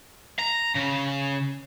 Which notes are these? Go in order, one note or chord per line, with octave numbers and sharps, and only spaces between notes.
A#5
C#3